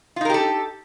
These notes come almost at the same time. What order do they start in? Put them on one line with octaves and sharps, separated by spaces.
F4 D#4 A#4 G4 A4